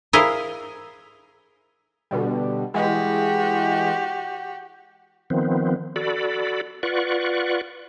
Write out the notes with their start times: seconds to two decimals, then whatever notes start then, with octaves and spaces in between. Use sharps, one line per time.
0.13 E4 G#4 A#4 C5 D#5 F5
2.11 B2 D3 G3
2.74 E3 G#3 F#4 G4
5.30 D#3 F3 B3 C4
5.96 F#4 A4 D5 B5
6.83 F4 B4 D5 F#5 C#6